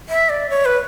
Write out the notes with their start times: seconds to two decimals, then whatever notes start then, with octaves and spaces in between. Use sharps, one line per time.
0.09 E5
0.29 D5
0.50 C#5
0.65 B4